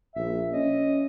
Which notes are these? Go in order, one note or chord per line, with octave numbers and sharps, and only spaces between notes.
A#1 E5
C#4 D#5